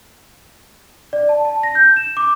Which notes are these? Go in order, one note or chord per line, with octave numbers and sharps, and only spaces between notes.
D5
A5
A5
A#6
G6
E7
D6